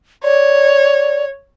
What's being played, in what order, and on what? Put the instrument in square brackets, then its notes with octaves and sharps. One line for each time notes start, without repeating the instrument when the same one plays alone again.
[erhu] C#5 [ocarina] D5